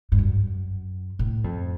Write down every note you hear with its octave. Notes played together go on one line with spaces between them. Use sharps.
G2
F#2
A2
F2